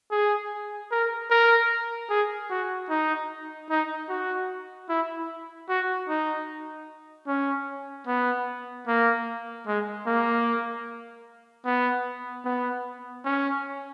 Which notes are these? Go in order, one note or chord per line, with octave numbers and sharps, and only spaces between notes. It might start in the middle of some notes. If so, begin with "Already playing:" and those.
G#4
A#4
A#4
G#4
F#4
D#4
D#4
F#4
E4
F#4
D#4
C#4
B3
A#3
G#3
A#3
B3
B3
C#4